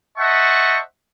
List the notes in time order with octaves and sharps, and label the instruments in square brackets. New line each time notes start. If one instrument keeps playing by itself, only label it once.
[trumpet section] C5 D#5 E5 F#5 A5 C#6